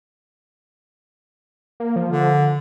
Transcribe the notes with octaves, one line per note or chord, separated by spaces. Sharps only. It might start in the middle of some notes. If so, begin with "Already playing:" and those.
A#3
F3
D3